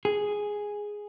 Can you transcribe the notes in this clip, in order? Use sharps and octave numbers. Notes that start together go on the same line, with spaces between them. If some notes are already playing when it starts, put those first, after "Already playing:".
G#4